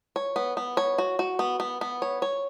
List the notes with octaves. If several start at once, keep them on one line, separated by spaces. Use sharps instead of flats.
C#5
B3
B3
C#5
F#4
F#4
B3
B3
B3
C#5
C#5